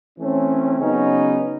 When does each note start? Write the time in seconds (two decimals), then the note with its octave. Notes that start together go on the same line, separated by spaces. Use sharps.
0.18 E3 A3 C4 C#4
0.78 C#3 F#3 B3 C#4 D#4